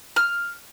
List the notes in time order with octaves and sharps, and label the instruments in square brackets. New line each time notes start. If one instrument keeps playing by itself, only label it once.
[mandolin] F6